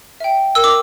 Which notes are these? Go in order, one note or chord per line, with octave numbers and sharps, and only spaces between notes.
E5 G5
A#4 E6
D6